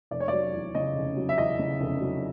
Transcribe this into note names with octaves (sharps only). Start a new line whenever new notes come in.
F1 D5
C#5
F#3 D5
E2
C#3 D#5
F1
F#3
E5
E2 D#5
C#3
F1
F#3